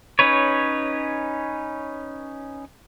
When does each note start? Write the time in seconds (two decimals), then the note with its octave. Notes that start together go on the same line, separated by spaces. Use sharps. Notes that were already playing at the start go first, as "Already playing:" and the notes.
0.19 C#4 D#4 B4 C#5